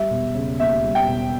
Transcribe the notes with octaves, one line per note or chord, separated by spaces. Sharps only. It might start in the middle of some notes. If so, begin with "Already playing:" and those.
Already playing: G3 E5
E1
C#3
D#2 E5
G3
G5
E1